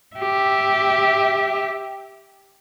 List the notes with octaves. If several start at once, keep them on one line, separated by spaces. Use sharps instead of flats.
G4 E5